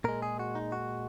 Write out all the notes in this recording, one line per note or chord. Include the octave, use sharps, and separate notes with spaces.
A#2 G#3 A#4
G#4
F#4
D#4
F#4